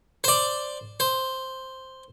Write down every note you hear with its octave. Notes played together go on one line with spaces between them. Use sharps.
C5 D5
C5